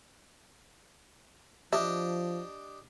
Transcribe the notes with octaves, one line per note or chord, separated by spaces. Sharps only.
F3 D4 G4 D#5 E5